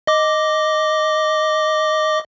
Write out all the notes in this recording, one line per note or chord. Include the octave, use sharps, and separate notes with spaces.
D#5 D6